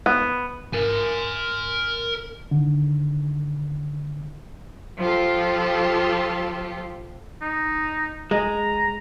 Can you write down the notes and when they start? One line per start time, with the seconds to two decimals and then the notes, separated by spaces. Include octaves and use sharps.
0.06 B3
0.73 A#4 G#5
2.51 D3 D#3
4.98 F3 F4 G4 A4
7.42 D#4
8.31 G#3 A#5